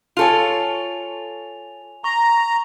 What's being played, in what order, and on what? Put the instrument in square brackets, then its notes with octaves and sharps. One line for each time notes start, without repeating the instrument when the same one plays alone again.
[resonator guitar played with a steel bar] F4 A4 C#5 [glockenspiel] G#5 F7
[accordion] A#5 [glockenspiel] C#6